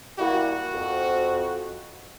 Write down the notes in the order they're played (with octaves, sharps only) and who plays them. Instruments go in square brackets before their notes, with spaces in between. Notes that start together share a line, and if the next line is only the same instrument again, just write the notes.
[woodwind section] G3 A#3 E4 [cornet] F#4
[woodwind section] F2